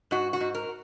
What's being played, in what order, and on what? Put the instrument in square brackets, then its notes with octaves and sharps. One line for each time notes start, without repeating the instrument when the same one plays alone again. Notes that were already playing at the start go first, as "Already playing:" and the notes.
[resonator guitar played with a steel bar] G#2 F#4
F#4
G#2
A#4